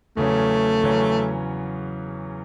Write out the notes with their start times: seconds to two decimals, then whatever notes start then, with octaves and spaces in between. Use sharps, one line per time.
0.17 E2 C#3 F#3 A3 C#4
0.83 E2 C#3 F#3 C#4